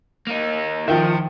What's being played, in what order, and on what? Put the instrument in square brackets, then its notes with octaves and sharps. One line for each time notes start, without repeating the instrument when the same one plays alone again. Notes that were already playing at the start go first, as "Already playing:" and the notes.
[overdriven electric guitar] A#3 D#4
[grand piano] D#3 F3 [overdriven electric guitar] E5 G5